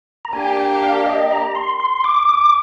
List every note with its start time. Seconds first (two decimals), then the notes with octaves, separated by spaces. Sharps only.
0.25 A#5
0.33 A#3 D4 G4 G#5
0.57 G5
0.82 F5
1.06 D#5
1.31 A#5
1.55 C6
1.80 C6
2.04 D6
2.29 D6